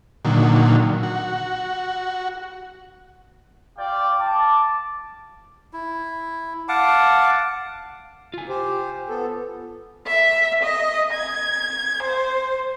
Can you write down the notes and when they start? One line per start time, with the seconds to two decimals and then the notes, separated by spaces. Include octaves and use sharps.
0.25 A#2 D3 D#3 F#3
1.03 F#4
3.78 F4 G4 D5 F5 G5
4.19 A5 D6
5.73 E4
6.68 F5 F#5 A5 D6
8.34 F4 G#5
8.49 G4 C5
9.09 B3 A4
10.07 E5
10.63 D#5
11.12 G#6
12.02 C5